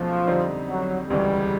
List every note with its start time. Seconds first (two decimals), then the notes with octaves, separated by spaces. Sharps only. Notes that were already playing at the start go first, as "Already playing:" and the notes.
Already playing: C#2 B2 F3 F#3 A3 C#4
0.27 F2 D3 G3 C4 D#4
0.69 F#3
1.10 E1 D2 C#3 E3 G3 G#3